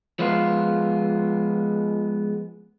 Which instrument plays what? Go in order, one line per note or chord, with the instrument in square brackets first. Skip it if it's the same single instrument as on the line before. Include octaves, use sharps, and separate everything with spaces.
[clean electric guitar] F3 G#3 B3 F4